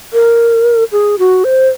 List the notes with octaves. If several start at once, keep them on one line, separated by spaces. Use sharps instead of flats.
A#4
G#4
F#4
C5